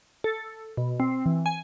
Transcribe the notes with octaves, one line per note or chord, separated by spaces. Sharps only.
A4
B2
C4
E3
G#5